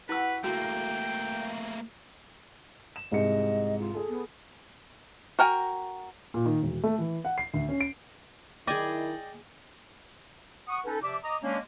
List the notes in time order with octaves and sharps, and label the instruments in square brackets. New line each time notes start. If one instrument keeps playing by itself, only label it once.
[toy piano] E4 E6 [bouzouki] F#4 G4 F#5 [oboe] B4
[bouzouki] C#3 [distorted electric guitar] A3 A#3 [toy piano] F#4 E6 [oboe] G5
[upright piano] E7
[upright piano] C2 G#2 C#7 [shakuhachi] D#5
[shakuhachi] F4
[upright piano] G#4 A4
[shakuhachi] B3
[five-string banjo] F#4 A#4 G5 G#5
[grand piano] A#2
D#3
E1
A3
E3
F#5
C7
D2
C#4
D7
[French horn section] D#3 E4 [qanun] G#4 G#5 [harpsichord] D5 D#5 G5 [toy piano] D6
[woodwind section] F#5 C#6 D#6
C#4 D#4 A4 B4
C3 F3 D5 E5 D6
D#5 A#5 D6 D#6
G#3 A#3 C#4 D4